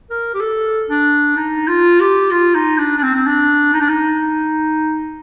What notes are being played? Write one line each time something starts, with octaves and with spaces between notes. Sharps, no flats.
A#4
G4
A4
D4
D#4
F4
G4
F4
D#4
D4
D4
C4
C4
D4
D#4
D4
D#4